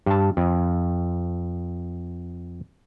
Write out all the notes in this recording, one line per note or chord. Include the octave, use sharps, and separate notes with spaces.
G2 A5
F2